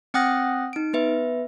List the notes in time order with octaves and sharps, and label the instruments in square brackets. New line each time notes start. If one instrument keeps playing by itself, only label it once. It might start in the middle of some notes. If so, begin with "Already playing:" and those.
[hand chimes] C4 F#5 G5 D#6 F#6 A#6
D#4 D7
B3 B4 E5